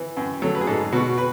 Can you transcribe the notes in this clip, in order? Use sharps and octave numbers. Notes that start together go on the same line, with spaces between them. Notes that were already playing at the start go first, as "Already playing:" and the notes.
Already playing: E3
F#2
F#3 A4
B4
G#4
G#2 A4
B2 F#4
B4